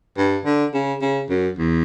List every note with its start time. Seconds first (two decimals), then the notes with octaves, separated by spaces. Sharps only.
0.18 G2
0.45 D3
0.74 C#3
1.02 C#3
1.30 F#2
1.59 E2